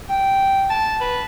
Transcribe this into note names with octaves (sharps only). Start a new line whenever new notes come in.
G5
A5
B4